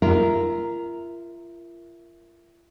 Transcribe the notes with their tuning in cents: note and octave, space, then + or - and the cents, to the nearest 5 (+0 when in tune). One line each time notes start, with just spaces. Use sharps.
F4 -35 A#4 +0 E5 +0